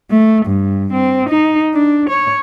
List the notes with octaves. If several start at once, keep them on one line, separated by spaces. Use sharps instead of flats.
A3
G2
C4
D#4
D4
C#5